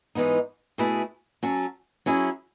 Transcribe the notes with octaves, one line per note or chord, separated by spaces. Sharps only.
G#2 E3 G#3 B3 D#4
B2 A3 E4 G#4 B4
F#3 C#4 F#4 A4
F#3 C#4 E4 G#4